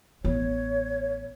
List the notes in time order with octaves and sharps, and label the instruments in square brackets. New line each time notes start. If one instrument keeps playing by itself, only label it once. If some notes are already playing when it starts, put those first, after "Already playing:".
[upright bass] A1 B3 [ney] C#5